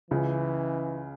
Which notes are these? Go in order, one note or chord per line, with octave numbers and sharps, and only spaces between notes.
C#2 C#3 E3